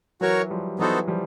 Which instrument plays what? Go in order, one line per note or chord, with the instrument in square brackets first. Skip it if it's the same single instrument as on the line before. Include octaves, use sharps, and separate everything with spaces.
[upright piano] E3 F#3 [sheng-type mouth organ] F#4 A#4 C#5
[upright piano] F3 G3
[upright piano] E3 F#3 [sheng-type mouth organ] B3 D#4 F#4 A4 C5
[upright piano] F3 G3